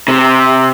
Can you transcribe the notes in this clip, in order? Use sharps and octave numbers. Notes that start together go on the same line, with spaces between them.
C3